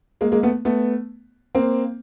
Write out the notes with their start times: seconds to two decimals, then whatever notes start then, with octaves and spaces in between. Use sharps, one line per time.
0.21 G#3 A#3
0.32 G#3 A#3
0.43 A3 B3
0.65 A3 B3
1.55 A#3 C4